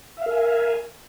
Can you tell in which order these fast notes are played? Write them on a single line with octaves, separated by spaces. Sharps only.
E5 F5 A#4 G#5